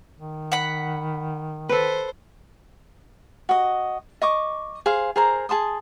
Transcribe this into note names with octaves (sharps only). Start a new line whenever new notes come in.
D#3
F#5 B5
A4 B4 C5
F#4 D#5
D#5 C#6 D6
G#4 C5 F5
G#4 A#4 C5 A#5
G#4 A5 C6 D#6